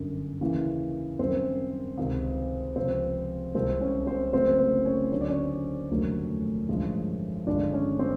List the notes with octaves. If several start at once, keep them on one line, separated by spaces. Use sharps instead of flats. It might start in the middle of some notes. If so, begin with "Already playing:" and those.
Already playing: G1 F#2 D3
D#2 C#3 E3
F#2 D#3 G3 C4 C5
C#2 C3 D#3
C#2 C3 F3 C4 C5
C2 C3 D#3 G#3 C4 C5
C#4 C#5
C4 C5
F#1 F#2 C#3 F#3 A3 C4 C5
C4 C5
C#4 C#5
D2 D3 F#3 C#5
D5
C#4 C#5
F1 D#2 D3 F#3 A3
A1 G2 D3 F3 G#3
G1 G2 D#3 G#3 D4 D5
C#4 C#5
C4 C5